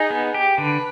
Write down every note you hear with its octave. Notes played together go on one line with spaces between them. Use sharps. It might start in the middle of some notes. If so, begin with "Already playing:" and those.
Already playing: D#4 G#4
B3
G4
D3 B4